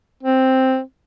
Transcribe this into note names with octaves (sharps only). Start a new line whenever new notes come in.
C4